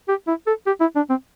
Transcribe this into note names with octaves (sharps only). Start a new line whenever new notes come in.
G4
E4
A4
G4
E4
D4
C4